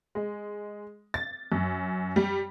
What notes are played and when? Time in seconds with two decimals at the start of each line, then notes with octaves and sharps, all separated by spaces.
0.15 G#3
1.14 A6
1.52 F#2
2.16 G3